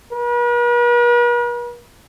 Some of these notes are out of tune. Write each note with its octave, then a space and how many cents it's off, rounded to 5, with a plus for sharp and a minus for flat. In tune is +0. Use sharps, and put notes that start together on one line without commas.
B4 -45